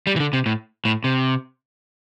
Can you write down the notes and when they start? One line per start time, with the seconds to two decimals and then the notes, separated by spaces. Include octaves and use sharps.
0.07 G3
0.16 E3
0.20 D3
0.33 C3
0.46 A2
0.85 A2
1.04 C3